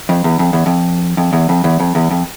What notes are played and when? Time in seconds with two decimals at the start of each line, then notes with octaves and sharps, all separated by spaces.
0.09 F2
0.24 E2
0.39 F2
0.53 E2
0.66 F2
1.17 F2
1.33 E2
1.49 F2
1.64 E2
1.80 F2
1.95 E2
2.11 F2